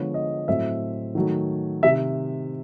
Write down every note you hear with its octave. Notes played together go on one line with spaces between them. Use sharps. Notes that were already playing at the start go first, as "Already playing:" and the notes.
Already playing: D3 F3 G#3 B3 C#5
D#5
A2 F#3 A3 C4 E5
D#3 F#3 A3
C3 D#3 E5